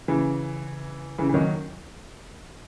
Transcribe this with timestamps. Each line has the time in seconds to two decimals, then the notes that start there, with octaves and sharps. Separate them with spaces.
0.08 C#3 E3
1.18 C#3 E3
1.30 E3
1.34 D#3 F#3